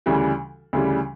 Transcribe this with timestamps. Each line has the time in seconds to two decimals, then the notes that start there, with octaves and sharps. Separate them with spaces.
0.06 D2 C#3 E3 G3
0.73 D2 C#3 E3 G3